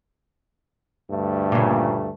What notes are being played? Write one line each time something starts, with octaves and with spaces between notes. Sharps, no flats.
D2 G2 A3
A#2 C#3